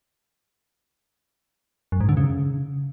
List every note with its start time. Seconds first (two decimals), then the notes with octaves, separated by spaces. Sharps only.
1.92 F#2
2.01 G#2
2.09 D3
2.17 C#3